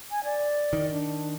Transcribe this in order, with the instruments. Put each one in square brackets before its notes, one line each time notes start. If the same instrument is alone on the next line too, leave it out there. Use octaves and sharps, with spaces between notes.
[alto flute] G#5
D5
[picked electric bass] D#3
[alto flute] D4